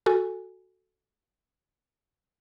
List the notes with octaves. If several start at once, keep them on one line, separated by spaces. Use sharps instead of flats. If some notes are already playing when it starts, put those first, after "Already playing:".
F#4 A4 G#5